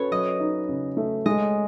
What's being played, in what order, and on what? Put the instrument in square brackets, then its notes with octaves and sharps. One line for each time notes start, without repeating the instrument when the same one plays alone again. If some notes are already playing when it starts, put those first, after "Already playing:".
Already playing: [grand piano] C#4 [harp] F#4 A4 B4 C#5
[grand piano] F#3 [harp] D#5
[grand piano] D#4
C#3
A3
[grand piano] G#3 [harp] D#5